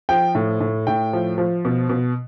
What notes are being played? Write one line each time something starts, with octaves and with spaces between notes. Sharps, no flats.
F3 G5
A2
A2
A2 G5
F3
F3
B2
B2